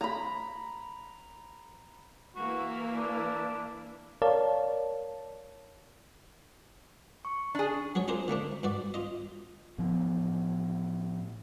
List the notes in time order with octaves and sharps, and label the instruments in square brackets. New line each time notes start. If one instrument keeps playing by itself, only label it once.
[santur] A#5 B5
[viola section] E3 A#3 E4 [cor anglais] F#4
[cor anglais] D4
[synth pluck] A#4 C#5 D5 F5 A5
[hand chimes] C#6
[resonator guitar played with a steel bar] D4 G#4
[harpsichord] F#3 G#4 C#5
D4 F4 G#4 A#4 C5
D3 A3 A#3 D4
G2 F#4 D5
F4 D#5
[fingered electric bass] A2 F3 B3